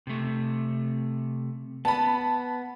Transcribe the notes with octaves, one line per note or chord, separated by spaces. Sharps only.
C3 A3
B3 A5 B5